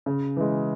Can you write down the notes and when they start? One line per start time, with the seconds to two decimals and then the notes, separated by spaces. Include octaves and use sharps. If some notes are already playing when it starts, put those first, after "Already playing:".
0.06 C#3
0.36 E3 G#3